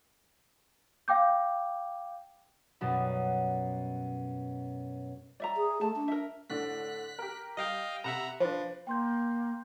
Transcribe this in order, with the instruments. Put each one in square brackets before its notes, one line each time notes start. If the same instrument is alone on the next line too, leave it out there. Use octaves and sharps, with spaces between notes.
[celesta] F5 G5 D6 G6
[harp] F#2 B2 G3
[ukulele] D5 E5 A#5
[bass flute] G#4
[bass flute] A3 [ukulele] A5
[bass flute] D4
[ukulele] A#4 E5
[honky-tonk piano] A2 D3 D4 [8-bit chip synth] F#6 B6
[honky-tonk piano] G4 A#4
[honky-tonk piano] G3 [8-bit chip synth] D#5 F5 G5
[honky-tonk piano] C3 B5 E7 [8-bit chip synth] E5 F#5 A#5
[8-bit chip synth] F3 [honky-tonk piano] D4 B4 [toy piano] C5
[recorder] A#3 [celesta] G5 C6 G6